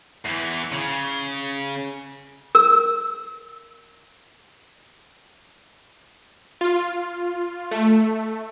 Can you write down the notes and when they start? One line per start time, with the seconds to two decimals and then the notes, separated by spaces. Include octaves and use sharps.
0.25 E2 E3
0.72 C#3
2.55 A#4 E6
6.61 F4
7.71 A3